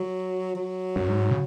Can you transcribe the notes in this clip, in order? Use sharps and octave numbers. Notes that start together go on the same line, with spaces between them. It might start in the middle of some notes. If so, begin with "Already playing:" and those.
Already playing: F#3
F#3
F#2
G#2
C#3